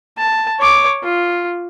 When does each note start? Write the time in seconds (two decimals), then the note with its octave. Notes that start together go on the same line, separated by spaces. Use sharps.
0.18 A5
0.60 C#5 D6
1.03 F4